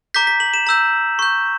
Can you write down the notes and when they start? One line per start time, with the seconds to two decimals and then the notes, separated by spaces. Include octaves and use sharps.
0.14 A#5 D6 G6 B6
0.27 B6
0.40 F#7
0.54 E7
0.67 A#5 E6 G6
1.19 C#6 G6